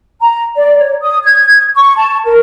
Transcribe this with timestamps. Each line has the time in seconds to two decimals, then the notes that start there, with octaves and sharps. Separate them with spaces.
0.21 A#5
0.56 D5
0.78 C#5
1.01 D#6
1.24 G#6
1.76 C#6
1.96 A5
2.25 A#4